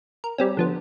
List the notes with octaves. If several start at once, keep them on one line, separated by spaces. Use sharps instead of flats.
A#4
G3 C4 C#4
D3 F3 B3